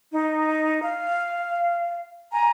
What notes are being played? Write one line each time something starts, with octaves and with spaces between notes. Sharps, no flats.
D#4
F5
G#5 A#5